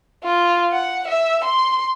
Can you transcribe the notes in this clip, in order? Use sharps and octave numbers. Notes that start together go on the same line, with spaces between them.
F4
F#5
E5
C6